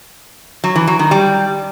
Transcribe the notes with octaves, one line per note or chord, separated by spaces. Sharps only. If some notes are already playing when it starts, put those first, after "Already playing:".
F#3
E3
F#3
D#3
G3